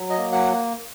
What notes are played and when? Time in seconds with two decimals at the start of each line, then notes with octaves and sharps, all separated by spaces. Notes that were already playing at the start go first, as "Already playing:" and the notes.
Already playing: F#3
0.10 D#5
0.17 A#3
0.32 F#5